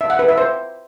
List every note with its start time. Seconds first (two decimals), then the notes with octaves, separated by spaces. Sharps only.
0.01 E5
0.10 F#5
0.19 B4
0.28 E5
0.38 C5